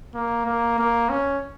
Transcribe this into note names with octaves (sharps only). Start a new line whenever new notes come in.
A#3
A#3
A#3
C#4